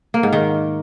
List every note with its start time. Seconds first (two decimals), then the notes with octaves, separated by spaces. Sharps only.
0.14 A#3
0.23 G#2
0.33 D#3